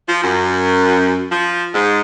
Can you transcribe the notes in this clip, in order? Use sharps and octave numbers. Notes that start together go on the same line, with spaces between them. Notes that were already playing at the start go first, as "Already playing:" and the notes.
F3
F#2
F3
G#2